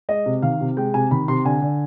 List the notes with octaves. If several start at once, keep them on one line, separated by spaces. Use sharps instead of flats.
G#3 D#5
C3
D#3 F5
C3
G#3 G5
C3 G#5
D#3 B5
C3 C6
D3 G#5
D3